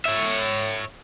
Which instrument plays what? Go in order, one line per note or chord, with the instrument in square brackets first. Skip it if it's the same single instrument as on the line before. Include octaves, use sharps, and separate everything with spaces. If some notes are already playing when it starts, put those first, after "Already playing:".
[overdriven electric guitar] C#5 E5